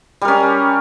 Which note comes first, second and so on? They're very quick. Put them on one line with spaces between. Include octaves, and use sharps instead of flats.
G3 A#4 C#4